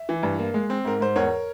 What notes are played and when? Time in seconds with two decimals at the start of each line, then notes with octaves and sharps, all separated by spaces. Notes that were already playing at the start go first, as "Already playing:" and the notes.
Already playing: E5
0.09 E3
0.23 G2
0.39 A#3
0.54 G#3
0.70 C4
0.85 G#2 A#4
1.00 G#2 C5
1.16 E2 A#4 C#5